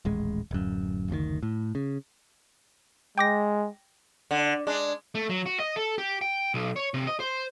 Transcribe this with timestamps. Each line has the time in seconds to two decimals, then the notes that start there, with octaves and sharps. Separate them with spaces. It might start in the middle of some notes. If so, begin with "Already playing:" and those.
0.05 D#1 A1 G#3
0.51 D1 F#2
1.10 F#1 D2 B2 D#3
1.43 A2
1.75 C#3
3.18 G#3 G5 D6 A#6
4.31 D3
4.67 G#3 D4
5.15 A3
5.29 F#3
5.46 F#4
5.60 D#5
5.76 A4
5.98 G4
6.21 G5
6.54 B1
6.76 C#5
6.94 C3
7.07 D#5
7.20 C5